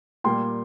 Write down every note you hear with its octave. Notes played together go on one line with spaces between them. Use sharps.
A#2 G3 A#3 G5 C6